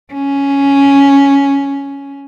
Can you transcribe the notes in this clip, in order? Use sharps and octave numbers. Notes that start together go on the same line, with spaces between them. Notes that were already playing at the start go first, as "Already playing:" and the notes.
C#4